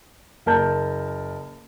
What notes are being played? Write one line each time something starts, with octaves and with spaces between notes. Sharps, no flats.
F#1 A#4 A5 G6